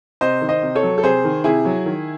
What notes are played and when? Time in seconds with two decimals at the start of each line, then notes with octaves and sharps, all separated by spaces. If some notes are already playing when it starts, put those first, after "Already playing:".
0.21 C3 C5 D#5
0.41 D#3
0.49 C5 D#5
0.62 C3
0.75 A4 C#5
0.83 F#3
0.98 A4
1.03 C3 G#4 C5
1.24 D#3
1.44 C3 E4 G#4
1.65 F#3
1.86 D#3